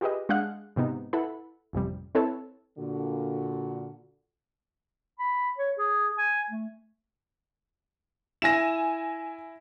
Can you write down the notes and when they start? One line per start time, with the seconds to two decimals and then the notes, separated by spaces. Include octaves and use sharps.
0.01 F4 G4 G#4 B4 D#5
0.29 G#3 D4 G#4 F5 F#5 F#6
0.76 G#2 C3 B3 D#4
1.13 E4 A4 B4 F#5 B5
1.73 A1 F2 C3 G3
2.15 C4 E4 A4 B4 C#5 A5
2.79 A#2 D3 F#4
5.19 B5
5.58 C#5
5.79 G#4
6.18 G#5
6.51 A3
8.42 E4 G#5 A#6 E7